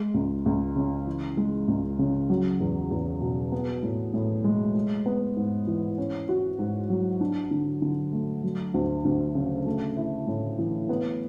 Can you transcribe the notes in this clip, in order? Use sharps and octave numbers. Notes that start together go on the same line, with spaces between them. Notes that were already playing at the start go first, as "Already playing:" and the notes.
Already playing: G#3
C#2
C#2
C#3
E3
G#3
C#2
C#3
F#3
E2
E2
B2
B3
A2
A2
G#3
G#3
B3
G#2
E3
C#4
F#4
G#2
F#3
D4
D3
D3
A3
F#3
D2
D2
C#3
A3
E4
A2
E3
B3